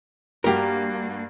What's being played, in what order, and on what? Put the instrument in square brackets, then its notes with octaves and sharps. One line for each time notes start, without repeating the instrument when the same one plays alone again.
[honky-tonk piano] G2 F#4 [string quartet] A#3 [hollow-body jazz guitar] G4 A#4